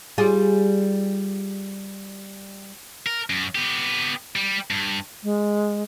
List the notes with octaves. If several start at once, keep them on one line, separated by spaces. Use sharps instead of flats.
G3 F4 G#4
A#4
F#2
B3 G4
G3
G2
G#3